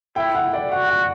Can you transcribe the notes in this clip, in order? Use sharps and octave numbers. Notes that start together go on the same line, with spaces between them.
E4 G5
F#5
D5
F#4 F#5
F#5